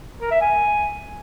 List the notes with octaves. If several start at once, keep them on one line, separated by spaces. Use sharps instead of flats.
A#4
E5
G#5